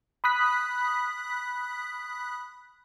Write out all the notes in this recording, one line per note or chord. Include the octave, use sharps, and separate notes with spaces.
B5 D#6 F#6 B6